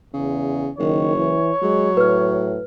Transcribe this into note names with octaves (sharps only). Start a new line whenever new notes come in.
E2 C#3
F#1 D#3 C#5
E3
F#3 G#3
A2 B4 F6